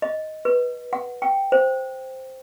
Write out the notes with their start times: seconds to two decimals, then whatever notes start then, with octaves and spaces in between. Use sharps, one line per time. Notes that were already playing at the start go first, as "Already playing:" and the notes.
0.02 D#5
0.45 B4
0.93 F#5
1.22 G5
1.52 C5